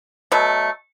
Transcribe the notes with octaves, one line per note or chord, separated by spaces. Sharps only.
B2 F#3 A3